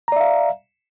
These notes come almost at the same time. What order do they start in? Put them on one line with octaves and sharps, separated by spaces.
A#5 D5 E5 F5